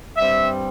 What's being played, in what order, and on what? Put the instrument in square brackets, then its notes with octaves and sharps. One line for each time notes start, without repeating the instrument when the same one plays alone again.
[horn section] G2 G3 C4 E5